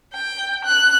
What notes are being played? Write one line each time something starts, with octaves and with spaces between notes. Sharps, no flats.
G5
F#6